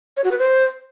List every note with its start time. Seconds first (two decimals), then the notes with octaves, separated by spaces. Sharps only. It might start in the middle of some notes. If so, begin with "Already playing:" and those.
0.17 C#5
0.24 F#4
0.31 B4
0.39 C5